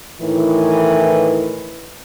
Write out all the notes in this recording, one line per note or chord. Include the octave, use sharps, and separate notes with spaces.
A2 D#3 E3